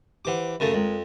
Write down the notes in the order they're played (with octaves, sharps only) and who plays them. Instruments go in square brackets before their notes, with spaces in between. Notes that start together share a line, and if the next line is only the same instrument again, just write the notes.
[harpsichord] E3 D6 [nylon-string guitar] G4 C5 F#5
[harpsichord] F#2 C#3 A3
[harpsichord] F2 [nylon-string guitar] G#3 A#4